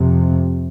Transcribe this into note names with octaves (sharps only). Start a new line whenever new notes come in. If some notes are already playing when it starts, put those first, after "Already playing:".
Already playing: F2 C3